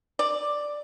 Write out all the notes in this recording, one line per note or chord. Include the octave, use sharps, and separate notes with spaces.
D5